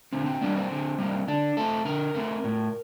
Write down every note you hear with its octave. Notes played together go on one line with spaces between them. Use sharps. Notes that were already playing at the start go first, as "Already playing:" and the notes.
D3 C4
C4
G3 A#3 D4
C4
D3
G3 A#3
D3 D4
A3 C4 A4
D3 A#4
A3 C4
A2